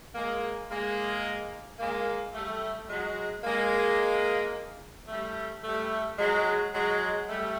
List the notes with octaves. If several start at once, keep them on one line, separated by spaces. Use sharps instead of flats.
G#3 A#3
G#3 A#3
G#3 A#3
G3 A3
F#3 G#3
G#3 A#3
G3 A3
G3 A3
F#3 G#3
F#3 G#3
G3 A3